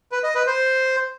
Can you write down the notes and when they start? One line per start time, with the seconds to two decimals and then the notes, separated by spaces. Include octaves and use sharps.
0.12 B4
0.24 D#5
0.35 B4
0.47 C5